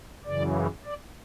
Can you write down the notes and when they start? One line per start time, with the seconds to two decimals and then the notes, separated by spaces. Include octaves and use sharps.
0.25 F#2 C#3 E3 D5
0.85 D5